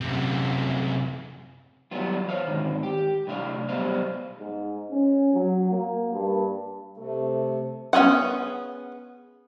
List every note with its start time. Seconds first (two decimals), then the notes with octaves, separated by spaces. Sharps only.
0.01 F#2 C3
1.91 E3 F#3 G3 B3 F4
2.29 C5 C#5 F5
2.47 G#2 D3 D#3
2.83 G4
3.27 A2 C3 D4 F5
3.69 B1 G3 B3 C5 F5
4.39 G#2
4.91 C#4
5.34 F#3
5.71 A#3
6.13 G2
6.97 C3 A3
7.93 B3 C#4 F4 G#4 F#5